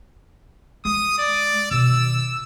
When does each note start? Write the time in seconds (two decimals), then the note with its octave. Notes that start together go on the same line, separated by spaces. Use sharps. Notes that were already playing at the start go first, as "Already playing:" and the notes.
0.85 G#3 D#6
1.19 D5
1.71 B2 D#3 E6